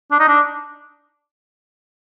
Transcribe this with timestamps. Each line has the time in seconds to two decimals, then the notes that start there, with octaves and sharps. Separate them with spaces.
0.11 D4
0.19 D#4
0.28 D4